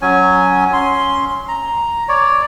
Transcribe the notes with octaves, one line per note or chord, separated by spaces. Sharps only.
F#3 C#4 G#5
C#4 C6
A#5
C#5 D5